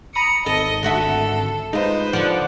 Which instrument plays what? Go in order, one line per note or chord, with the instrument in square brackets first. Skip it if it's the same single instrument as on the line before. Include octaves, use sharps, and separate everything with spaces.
[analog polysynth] A#5 B5 D#6 [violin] C#7
[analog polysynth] G#1 [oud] A4 [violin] D#5
[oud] D3 F#4 E5 [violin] A4
[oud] G#3 F4 [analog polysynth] D#4 [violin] B4 C5
[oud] D3 F3 [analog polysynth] D5 F#5 D6